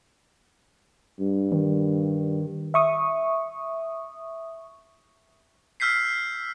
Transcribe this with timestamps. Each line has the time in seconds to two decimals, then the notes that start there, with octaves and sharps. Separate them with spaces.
1.20 G2
1.52 D#3
2.74 E5 C#6 D#6
5.80 E6 F6 G6 B6 C7